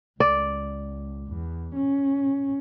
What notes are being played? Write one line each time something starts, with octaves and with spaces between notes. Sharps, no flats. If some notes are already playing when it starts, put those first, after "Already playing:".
C#2 D5
E2
C#4